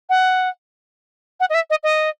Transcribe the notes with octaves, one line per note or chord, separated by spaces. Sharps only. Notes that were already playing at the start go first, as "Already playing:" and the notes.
F#5
F#5
D#5
E5
D#5
D#5